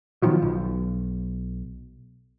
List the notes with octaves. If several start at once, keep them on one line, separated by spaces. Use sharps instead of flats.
B2 D#3 F3 F#3
B1